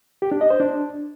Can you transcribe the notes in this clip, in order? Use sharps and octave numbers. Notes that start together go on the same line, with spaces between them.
G4
D4
D#5
C5
D4